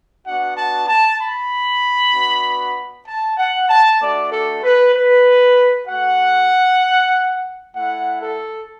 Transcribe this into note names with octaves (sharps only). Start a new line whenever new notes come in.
B3 D4 F#4 F#5
A5
A5
B5
B3 D4 F#4
A5
F#5
A5
A3 D4 F#4 D5
A4
B4
B4
A3 F#4 F#5
A3 E4 F#5
A4